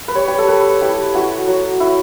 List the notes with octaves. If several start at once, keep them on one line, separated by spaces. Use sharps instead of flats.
B4
G3 C#5
G4
A4
G3 B4
E4 G4
E4 F#4
F#3
E4